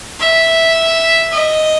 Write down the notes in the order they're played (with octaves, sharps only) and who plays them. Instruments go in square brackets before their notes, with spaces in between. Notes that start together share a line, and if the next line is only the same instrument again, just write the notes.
[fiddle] E5
D#5